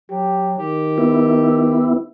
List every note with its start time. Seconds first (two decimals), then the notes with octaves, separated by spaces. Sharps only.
0.11 F#3 G4
0.59 D#3 G4
0.98 B3 E4